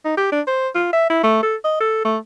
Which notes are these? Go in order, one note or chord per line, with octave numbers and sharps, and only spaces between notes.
D#4
G4
D4
C5
F4
E5
E4
A3
A4
D#5
A4
A3